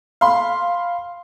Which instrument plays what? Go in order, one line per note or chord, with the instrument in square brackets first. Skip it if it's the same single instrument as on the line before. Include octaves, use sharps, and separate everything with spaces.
[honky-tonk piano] F5 B5 C6